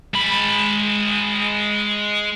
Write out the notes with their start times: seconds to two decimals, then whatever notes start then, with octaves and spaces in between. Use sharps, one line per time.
0.14 G#3 B5